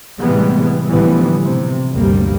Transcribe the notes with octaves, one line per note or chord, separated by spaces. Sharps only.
A2 C3 E3 G3 G#3 B3
A2 D3 E3 F3 G3 B3
C3
A1 D2 G2 G3 A#3